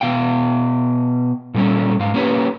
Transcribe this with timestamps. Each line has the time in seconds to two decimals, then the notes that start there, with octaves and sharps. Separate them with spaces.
0.01 B2 F5 G5
1.54 A#2 G3 A3 C#4
1.99 G#2 F5
2.14 A#3 C#4 G4 B4 C#5